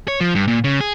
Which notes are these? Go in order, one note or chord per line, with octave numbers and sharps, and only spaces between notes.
C#5
F3
G2
A#2
C#3
G#4